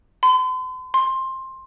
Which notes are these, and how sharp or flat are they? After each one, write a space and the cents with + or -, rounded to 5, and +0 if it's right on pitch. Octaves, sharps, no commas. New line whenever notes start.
C6 -45
C6 +15